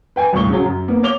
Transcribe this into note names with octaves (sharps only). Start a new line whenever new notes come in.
B4 G5 G#5
D#1 C2 A2 C#6 G7
C#3 F#3
F#2
A#3 B3
C#5 D6 F7 G7